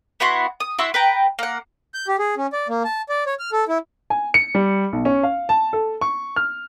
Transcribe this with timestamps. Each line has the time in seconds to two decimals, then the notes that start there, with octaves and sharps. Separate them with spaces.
0.20 B3 E4 F#4 C6
0.60 D#6
0.79 E4 F#4 C6 E6
0.94 B4 G5 A#5
1.39 A#3 F#5
1.94 G6
2.08 G4
2.19 G#4
2.37 C#4
2.53 D5
2.69 A#3
2.84 A5
3.09 D5
3.26 C#5
3.39 F6
3.52 A4
3.68 E4
4.10 G#5
4.34 C#7
4.55 G3
4.93 B1
5.05 C#4
5.23 F5
5.49 A5
5.73 A4
6.01 C#6
6.36 F6